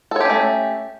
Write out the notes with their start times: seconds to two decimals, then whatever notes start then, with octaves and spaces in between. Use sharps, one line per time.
0.11 A4
0.16 C#5
0.21 G4
0.25 C#4
0.30 A3